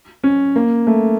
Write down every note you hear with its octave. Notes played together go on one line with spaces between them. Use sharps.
C#4
A#3
A3